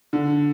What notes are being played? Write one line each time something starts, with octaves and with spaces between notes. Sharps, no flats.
D3